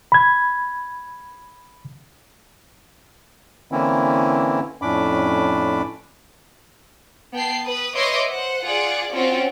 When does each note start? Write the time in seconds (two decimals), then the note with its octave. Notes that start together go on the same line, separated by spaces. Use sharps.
0.12 B5 G#6
3.72 D3 E3 A#3 C4 C#4 E4
4.82 F2 A2 C#4 D4 B5 D6
7.34 B3 G5 A5 C7
7.66 B4 D#6
7.95 B4 C#5 D#5 E5 C6 D6
8.30 C5 F#5
8.64 F4 G#4 D5 F#5
9.12 C4 C#4 F4 F#4 C#5